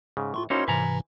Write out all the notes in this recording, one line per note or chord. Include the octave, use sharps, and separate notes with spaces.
G#2 C#3
A2 F4 C6 C#6
A#3 C#4 D#4 E4 F#4 C5 C#5 C6
G#2 C3 E3 B4 G#5 A#5